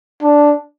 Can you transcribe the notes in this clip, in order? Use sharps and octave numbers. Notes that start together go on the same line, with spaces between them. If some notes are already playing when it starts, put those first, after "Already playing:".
D4